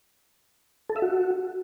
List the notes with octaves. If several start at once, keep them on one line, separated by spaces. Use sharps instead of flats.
A4
E5
F#4